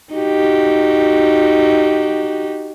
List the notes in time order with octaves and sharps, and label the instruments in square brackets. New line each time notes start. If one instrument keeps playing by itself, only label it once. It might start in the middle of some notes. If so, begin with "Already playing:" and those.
[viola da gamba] D#4 F#4 G4